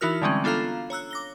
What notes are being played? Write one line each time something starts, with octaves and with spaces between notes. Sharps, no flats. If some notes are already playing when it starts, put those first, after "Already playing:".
E3 D#4 E4 F#4 A#4 F6
D3 E3 G3 G#3 C4 C#4
B3 D4 F4 A4 F5 A#5
C#5 A#5 E6 F#6
D6 A#6 G7